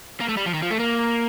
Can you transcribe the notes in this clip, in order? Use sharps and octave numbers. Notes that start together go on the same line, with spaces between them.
A#3
A3
G3
F3
D#3
F3
A3
A#3